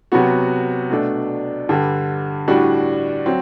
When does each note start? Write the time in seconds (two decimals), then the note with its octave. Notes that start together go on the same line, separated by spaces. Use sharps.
0.12 C3 F#3 B3 F#4
0.90 B2 A3 D4
1.69 G2 D3 G3
2.48 A2 G3 D4 F#4
3.26 F#3 C4